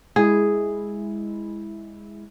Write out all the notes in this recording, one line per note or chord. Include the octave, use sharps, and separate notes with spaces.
G#3 E4 G#4